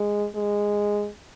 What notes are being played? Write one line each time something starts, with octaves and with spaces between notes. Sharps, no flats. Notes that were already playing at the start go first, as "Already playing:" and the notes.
Already playing: G#3
G#3